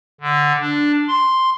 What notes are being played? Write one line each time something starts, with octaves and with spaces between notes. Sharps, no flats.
D3
D4
C6